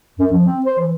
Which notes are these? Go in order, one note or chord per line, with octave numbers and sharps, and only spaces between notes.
F#2
F3
C4
C5
E3